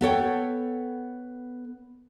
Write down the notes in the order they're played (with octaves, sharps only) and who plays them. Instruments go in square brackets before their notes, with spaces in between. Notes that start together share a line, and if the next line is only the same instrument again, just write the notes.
[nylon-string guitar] B3 A4 C#5 G5